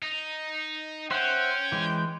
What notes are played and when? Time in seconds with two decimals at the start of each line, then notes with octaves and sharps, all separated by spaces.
0.03 D#4
1.11 C#4 C5 E5 F#5 G5
1.72 E3 G#3